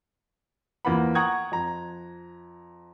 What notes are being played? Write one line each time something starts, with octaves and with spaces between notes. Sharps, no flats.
E2 F3 A#3 B3 F#5 B5
F#5 G5 A#5 C#6 D#6 G#6
F2 A#5